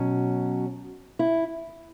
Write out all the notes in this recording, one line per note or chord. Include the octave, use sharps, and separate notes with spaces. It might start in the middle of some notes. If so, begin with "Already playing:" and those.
Already playing: B2 F#3 C#4
E4